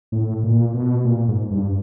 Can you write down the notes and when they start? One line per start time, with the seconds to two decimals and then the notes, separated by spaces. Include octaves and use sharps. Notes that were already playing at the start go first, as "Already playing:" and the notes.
0.12 A2
0.44 A#2
0.74 B2
1.05 A#2
1.28 G#2
1.51 G2